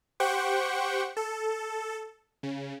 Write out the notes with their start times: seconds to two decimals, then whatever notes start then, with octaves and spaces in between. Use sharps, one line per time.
0.20 G4 C5 F#5 G5 C#6
1.17 A4
2.43 C#3